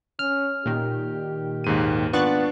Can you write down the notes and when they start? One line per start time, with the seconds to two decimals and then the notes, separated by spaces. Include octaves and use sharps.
0.19 C#4 F6
0.66 A#2 D#3 G4
1.64 D#2 G#2 D#7
2.13 B3 D4 F4 C#6 F#6 A6